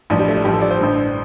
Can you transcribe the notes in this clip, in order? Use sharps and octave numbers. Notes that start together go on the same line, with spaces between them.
A1 G2 F3 D4
G3
A3
D4
A1 G2 F3 G4
A4
D5
C5
A1 G2 D3